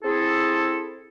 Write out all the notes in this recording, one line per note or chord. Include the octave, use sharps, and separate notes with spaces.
C4 E4 G#4 A4